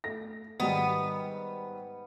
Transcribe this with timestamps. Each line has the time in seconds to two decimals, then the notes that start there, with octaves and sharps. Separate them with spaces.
0.04 A3 A#6
0.60 G#2 D#3 G3 B3